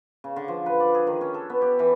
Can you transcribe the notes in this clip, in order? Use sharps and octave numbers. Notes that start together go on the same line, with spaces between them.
C#3
D3
F3
B4
D5
G#4
D#3
C#4
A4
B3
G4
E3